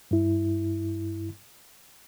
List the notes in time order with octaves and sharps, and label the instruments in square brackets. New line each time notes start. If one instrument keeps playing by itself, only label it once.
[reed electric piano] G2 E4